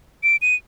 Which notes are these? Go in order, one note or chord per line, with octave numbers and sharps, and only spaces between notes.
D7
D#7